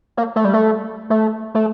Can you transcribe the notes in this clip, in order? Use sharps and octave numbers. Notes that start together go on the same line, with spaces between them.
A#3
A3
G3
A3
A3
A3